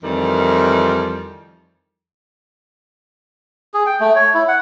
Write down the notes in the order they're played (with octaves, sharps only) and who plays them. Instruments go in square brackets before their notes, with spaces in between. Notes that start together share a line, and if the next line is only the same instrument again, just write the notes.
[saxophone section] F2 D#3 E3 G3
[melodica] G#4
G5
A3
C#5
E4
F#5